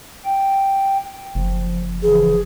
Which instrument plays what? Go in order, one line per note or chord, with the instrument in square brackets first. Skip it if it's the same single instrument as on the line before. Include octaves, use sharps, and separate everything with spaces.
[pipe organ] G5
[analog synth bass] F#1 [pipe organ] F3
[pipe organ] C#3 E3 F3 [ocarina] G#4